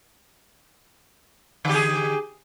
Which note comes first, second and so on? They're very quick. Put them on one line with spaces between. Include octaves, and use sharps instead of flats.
D3 G4 G#4